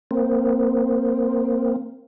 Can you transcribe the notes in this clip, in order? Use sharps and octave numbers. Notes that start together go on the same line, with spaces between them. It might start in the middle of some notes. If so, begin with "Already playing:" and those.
A#3 C4